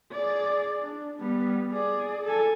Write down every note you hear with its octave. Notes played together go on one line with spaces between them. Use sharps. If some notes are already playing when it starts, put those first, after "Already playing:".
G#4 D5
D4
G3 B3
G#4 D5
A4 G#5